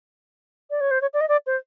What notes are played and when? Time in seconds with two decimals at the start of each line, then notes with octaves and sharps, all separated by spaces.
0.70 D5
0.81 C#5
0.91 C5
1.01 C#5
1.14 D5
1.21 D#5
1.28 D5
1.47 C5